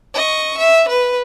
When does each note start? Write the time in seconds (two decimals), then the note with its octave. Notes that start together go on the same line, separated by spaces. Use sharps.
0.15 D#5 C#6
0.57 E5
0.88 B4